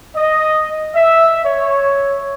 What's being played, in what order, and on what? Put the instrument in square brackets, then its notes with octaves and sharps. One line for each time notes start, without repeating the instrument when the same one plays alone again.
[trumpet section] D#5
E5
C#5